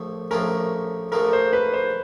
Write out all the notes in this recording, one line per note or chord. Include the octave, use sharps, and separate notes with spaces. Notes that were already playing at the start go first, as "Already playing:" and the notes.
Already playing: A#1 A2 F3 A3
A#1 A2 F3 A3 C#4 A#4
A#1 A#2 F3 A3 A#4
C5
B4
C5